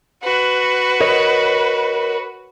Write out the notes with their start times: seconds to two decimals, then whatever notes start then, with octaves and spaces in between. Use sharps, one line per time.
0.23 F#4 B4
1.00 A#4 C#5 D#5